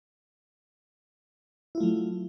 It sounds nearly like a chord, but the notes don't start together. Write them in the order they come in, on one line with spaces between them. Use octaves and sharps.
E4 F4 A3 F#3